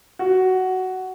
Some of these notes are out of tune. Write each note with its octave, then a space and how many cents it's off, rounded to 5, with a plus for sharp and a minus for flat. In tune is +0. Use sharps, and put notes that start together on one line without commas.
F#4 +10